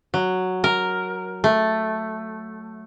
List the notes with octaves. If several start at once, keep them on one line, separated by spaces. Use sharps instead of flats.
F#3
A#4
A3